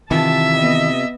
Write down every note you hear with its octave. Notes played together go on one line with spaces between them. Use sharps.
C3 D#3 E3 F4 E5 A5
B3 D#5